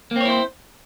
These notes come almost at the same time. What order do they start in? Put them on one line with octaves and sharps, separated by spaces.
A#3 C4 C#5 E4 C5